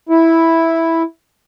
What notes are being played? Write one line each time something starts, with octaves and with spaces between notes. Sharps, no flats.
E4